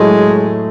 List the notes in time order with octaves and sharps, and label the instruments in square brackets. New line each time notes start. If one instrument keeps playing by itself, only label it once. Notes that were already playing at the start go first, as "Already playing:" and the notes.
Already playing: [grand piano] A2 F#3 A3 [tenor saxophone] G#3